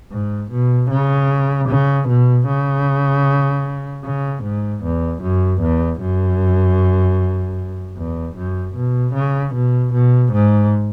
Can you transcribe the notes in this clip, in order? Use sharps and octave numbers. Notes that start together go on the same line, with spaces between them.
G#2
B2
C#3
C#3
B2
C#3
C#3
G#2
E2
F#2
E2
F#2
E2
F#2
B2
C#3
B2
B2
G#2